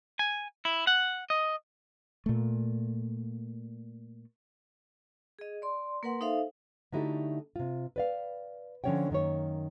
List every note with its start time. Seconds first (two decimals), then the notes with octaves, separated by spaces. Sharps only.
0.19 G#5
0.65 E4
0.87 F#5
1.30 D#5
2.26 A#2 A3
5.39 G#4 D#5
5.62 D5 C6
6.03 A#3 A#4 B4 F#5 C6
6.21 D#4 A4 C5 E5 F5
6.92 D3 A3 D#4 E4 F#4 G4
7.56 C3 F4
7.96 B4 D5 F5
8.84 D3 F3 C#4 C#5 F#5 G5
9.10 F#2 D#3 A#3 C#5